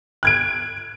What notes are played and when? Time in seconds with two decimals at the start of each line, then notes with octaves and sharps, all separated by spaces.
0.23 F#6 G#6 D7